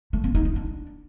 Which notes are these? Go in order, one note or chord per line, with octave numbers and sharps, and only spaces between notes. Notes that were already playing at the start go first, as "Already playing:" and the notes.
A3
C4
D#4
D#4
D4